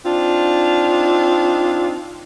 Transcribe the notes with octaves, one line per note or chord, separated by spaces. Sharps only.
C4 D4 D#4 F4